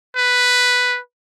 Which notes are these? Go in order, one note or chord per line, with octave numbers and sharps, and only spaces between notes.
B4